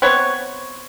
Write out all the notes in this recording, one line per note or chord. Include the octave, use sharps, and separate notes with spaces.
B3 C4 B4 C#5